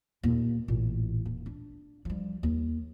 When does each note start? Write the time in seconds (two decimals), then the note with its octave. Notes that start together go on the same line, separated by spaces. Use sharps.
0.23 D#2 A#2
0.68 A1 A#2
1.26 D#1
1.46 D4
2.05 F3 G3
2.43 D#2